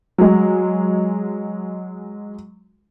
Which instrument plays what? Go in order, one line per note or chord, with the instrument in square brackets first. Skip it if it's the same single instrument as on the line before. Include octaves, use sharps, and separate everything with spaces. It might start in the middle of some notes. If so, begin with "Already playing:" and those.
[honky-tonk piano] F#3 G#3